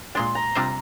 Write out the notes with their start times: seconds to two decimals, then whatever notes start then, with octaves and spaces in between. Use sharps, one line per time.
0.15 A#2 G#3 D4 C6
0.35 A#5
0.55 C3 G3 D4 F4 C5